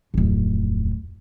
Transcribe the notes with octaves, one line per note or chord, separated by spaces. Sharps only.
D1 F2